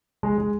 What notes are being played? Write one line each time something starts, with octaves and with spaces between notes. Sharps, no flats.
G#3
G#3